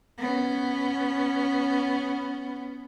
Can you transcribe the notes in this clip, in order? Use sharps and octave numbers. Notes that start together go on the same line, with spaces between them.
B3 C#4